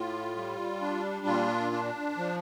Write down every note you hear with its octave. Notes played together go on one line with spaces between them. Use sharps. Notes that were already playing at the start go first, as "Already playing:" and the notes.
Already playing: A2 F4
G3
D4
A#2 F4
D4
F3